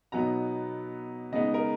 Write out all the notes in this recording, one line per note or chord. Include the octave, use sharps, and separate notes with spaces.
B2 F#3 B3 D#4 A#5
C#3 G#3 B3 D#4 D#5
A#4